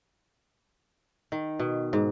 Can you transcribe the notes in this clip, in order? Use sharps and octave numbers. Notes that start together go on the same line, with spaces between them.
D#3
B2
G#2